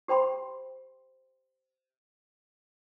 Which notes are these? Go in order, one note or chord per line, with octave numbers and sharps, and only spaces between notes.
G4 C5 G5 B5 C6